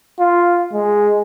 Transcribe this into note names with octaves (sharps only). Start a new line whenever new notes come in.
F4
G#3